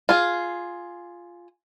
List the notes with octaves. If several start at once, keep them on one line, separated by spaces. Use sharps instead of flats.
F4 G#4